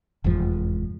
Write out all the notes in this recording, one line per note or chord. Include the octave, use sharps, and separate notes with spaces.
F1 E2 G#2 F3